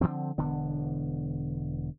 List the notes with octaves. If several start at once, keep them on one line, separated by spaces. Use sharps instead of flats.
D3 E3 F3 C4
E1 D3 B3